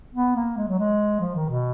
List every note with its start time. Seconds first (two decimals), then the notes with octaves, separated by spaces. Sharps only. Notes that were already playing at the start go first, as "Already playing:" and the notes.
0.14 B3
0.36 A#3
0.57 G#3
0.68 F#3
0.79 G#3
1.20 F3
1.35 D#3
1.49 B2